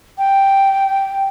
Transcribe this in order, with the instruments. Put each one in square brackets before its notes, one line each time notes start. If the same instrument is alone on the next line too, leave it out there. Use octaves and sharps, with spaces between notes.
[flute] G5